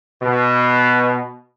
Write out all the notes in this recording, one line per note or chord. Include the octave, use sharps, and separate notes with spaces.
B2